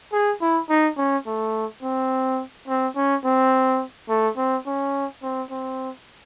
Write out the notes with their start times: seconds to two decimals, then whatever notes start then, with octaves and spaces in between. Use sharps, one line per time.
0.12 G#4
0.41 E4
0.69 D#4
0.98 C#4
1.26 A3
1.83 C4
2.68 C4
2.96 C#4
3.24 C4
4.09 A3
4.37 C4
4.66 C#4
5.22 C4
5.50 C4